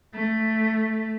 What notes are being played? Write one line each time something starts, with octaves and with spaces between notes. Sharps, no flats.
A3